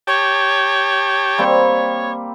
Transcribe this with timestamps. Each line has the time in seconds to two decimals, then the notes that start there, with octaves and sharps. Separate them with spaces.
0.07 G4 C#5 G5 A5
1.38 G3 A#3 C4